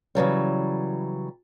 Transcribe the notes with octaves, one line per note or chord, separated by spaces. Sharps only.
C#3 E3 F#3 G3